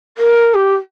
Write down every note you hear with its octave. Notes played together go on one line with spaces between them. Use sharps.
A#4
G4